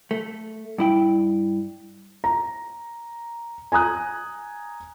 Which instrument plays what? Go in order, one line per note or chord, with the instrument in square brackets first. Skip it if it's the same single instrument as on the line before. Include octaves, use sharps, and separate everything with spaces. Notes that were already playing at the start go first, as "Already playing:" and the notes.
[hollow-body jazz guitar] A3
G2 E4 G5
[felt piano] A#5
G#5 A#5 D#6 F#6